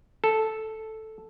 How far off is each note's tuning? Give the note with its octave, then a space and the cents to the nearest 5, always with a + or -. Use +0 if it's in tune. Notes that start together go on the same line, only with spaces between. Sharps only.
A4 +0